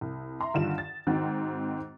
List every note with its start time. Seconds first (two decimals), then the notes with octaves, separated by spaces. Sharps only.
0.01 C2
0.40 E5 A#5 C6
0.54 G2 D3 D#3 F4 E7
0.78 A6
1.07 G#2 D#3 C4 F#4